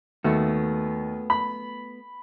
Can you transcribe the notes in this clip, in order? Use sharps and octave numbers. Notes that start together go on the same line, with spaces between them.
D#2 A3 B3 F#4
B5